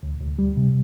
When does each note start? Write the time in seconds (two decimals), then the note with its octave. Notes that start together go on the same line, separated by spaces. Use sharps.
0.03 D2
0.21 D2
0.39 G3
0.57 C3